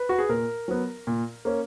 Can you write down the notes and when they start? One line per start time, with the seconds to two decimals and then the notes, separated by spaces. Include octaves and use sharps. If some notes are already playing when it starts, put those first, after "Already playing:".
Already playing: B4
0.09 F#4
0.19 G#4
0.29 A#2 A#4
0.68 F#3 B3
1.07 A#2
1.45 A#3 C#4